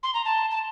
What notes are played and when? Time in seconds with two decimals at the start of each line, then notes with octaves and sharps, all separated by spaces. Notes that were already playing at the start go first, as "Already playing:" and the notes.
0.03 C6
0.14 A#5
0.24 A5
0.50 A5